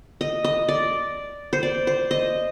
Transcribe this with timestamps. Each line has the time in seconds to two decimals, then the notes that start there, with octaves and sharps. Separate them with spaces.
0.21 D#5
0.44 D#5
0.69 D5
1.53 C5
1.63 D5
1.87 C5
2.11 D#5